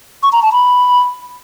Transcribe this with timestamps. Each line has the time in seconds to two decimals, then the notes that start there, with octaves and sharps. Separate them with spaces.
0.23 C#6
0.33 A#5
0.42 A5
0.52 B5